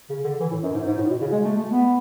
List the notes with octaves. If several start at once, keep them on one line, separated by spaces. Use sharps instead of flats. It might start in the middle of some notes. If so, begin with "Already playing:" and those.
C#3
D3
E3
A2
F#2
G#2
G#2
A2
B2
C#3
G#3
A3
A3
B3